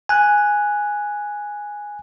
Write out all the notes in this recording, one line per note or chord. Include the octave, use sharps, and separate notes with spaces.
G#5 F#6